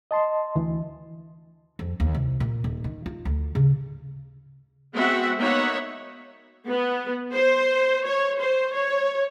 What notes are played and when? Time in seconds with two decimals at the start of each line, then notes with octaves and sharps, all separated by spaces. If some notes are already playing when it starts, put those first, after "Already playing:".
0.11 D#5 A5 C6
0.55 D2 E3
1.79 F2
2.00 D#2
2.15 C2
2.40 A#2
2.64 D#1
2.84 D#3
3.06 F4
3.25 D2
3.55 C#3
4.94 G#3 B3 C4 F#4 E5 F#5
5.39 A#3 B3 D#4 C#5 E5 F#5
6.68 B3
7.34 C5
8.04 C#5
8.38 C5
8.74 C#5